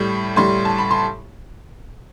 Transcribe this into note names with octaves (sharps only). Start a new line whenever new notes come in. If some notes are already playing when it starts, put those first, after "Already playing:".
Already playing: A2 G3
A2 G3 C6
A5
B5
C6